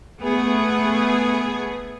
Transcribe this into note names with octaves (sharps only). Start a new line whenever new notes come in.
A3 B3 G#4